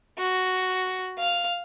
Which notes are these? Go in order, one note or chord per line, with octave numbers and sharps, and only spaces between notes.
F#4
F5